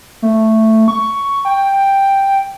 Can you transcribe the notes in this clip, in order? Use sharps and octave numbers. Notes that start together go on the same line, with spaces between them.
A3
C#6
G5